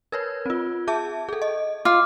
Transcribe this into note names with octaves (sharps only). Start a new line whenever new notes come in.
A#4 B4 C#5 G#6
C4 F4
G#4 E5 A5
G#4 A4
D#5
F4 D6 F6